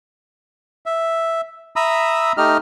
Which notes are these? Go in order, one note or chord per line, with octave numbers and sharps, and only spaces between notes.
E5
E5 A#5 B5 D#6 E6
A3 D#4 G4 D#5 F6